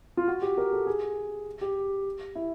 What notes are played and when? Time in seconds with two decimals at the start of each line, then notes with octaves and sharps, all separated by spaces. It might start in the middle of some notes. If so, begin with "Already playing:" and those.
0.17 F4
0.28 F#4
0.42 G4
0.58 A#4
0.73 A4
0.86 G#4
1.61 G4
2.35 E4